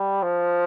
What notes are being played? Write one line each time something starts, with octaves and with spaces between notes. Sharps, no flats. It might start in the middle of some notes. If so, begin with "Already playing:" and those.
Already playing: G3
F3